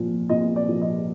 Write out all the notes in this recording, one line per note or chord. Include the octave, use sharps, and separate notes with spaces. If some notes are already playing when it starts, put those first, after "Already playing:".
Already playing: A#2 F3
A#2 D#5
D5
F3
D#5